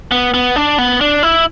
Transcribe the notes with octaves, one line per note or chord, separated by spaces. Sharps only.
B3
B3
D4
B3
D4
E4